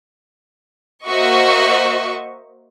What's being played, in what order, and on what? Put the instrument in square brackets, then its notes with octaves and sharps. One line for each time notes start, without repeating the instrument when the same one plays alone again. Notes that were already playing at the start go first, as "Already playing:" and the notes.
[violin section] A#3 F#4 C5 D#5 E5 C#6